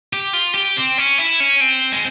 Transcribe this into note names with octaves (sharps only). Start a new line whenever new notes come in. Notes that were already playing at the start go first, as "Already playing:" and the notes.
G4
F4
G4
C4
C#4
E4
C#4
C4
G#3